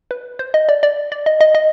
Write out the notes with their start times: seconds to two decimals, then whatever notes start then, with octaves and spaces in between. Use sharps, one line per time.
0.11 B4
0.39 C5
0.54 D#5
0.69 D5
0.83 D5
1.12 D5
1.26 D#5
1.41 D#5
1.55 D#5